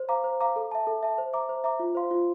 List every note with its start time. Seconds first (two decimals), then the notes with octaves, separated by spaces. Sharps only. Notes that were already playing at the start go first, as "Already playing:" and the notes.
Already playing: C5
0.09 F5 A#5 D6
0.24 C5
0.41 F5 A#5 D6
0.56 A4
0.71 E5 A5
0.87 A4
1.03 E5 A5
1.18 C5
1.33 E5 A#5 D6
1.49 C5
1.64 E5 A#5 D6
1.80 F4
1.95 C5 F5 C6
2.11 F4